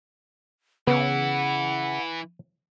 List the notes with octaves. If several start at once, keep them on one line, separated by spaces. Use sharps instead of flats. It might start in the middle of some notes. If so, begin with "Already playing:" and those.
C#3 E3 B3 E4 F#5